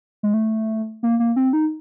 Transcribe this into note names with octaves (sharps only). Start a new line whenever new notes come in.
G#3
A3
A#3
A#3
C4
D#4